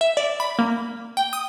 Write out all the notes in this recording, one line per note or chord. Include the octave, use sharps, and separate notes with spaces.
E5
D5
B5
A#3
G5
D#6